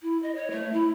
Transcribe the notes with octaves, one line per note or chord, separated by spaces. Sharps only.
E4
D#5
C#5
A3
E4